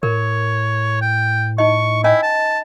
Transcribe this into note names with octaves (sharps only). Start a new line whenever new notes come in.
A2 A#4 C#5
G5
D#4 D#5 C#6
C#4 E4 D#5 G#5
A5